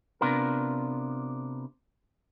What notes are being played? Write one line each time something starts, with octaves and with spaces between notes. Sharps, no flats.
C3 B3 D4 F4 A#4